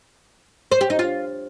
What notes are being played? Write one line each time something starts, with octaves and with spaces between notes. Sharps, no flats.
C5
G4
D#4
F4